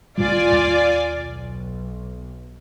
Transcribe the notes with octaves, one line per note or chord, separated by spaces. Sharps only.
C2 A2 G3 F4 D5 G#5
D#2
B1